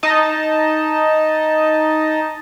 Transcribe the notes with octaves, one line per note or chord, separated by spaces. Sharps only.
D#4 D#5 A5